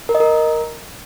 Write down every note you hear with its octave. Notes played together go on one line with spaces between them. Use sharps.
A#4
D#5
A#4